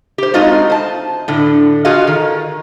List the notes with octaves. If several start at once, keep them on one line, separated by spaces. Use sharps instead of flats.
G4 C5
G#3 A3 C4 D#4 F4 F#4
C5 A5
A2 D3
F4 F#4 G#4 A4 D#5 F5
D#3